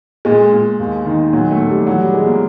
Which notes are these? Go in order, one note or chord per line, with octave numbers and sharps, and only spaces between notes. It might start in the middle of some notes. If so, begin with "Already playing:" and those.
A#2 G#3
A#2
D#2
D#3
A#2 F#3
A3
A#2
G3
E3 F#3
G3
E3 G#3
A#3